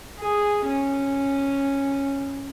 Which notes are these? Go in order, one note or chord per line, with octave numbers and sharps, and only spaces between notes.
G#4
C#4